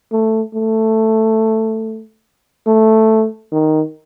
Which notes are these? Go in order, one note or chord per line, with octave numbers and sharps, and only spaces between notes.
A3
A3
A3
D#3